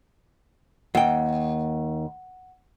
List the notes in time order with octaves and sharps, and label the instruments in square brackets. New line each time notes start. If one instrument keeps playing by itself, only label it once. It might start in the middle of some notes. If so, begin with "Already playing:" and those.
[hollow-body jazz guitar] D#2 G5 [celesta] F#5